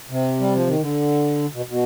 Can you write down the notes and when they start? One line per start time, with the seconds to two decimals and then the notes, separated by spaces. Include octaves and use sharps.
0.10 C3
0.40 G3
0.54 F3
0.67 D#3
0.81 D3
1.54 B2
1.70 B2